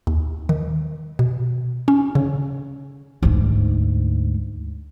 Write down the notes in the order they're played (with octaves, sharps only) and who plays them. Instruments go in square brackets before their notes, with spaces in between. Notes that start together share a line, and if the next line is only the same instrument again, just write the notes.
[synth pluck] D#2
D#3
B2
C#4
C#3
[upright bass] D2 G#2